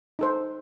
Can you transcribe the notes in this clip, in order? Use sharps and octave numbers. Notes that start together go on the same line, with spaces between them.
D#4 A4 C5